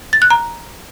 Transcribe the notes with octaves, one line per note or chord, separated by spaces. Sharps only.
A6
F#6
A#5